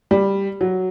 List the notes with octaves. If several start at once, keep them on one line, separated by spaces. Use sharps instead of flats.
G3
F#3